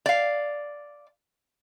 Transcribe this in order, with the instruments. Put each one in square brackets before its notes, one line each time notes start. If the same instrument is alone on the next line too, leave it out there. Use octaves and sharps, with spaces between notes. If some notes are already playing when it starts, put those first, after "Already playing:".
[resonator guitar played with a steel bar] D5 F5